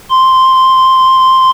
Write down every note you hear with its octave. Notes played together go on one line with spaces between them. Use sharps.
C6